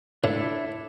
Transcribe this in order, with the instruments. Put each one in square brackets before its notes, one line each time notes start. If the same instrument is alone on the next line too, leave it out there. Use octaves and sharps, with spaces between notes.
[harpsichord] A2 [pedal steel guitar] D4 E4 A4